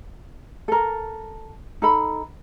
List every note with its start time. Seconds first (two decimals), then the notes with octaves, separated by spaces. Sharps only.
0.68 A4 A#4
1.82 D#4 A4 B5